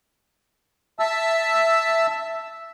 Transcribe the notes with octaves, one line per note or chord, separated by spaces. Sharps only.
E5 A5 E6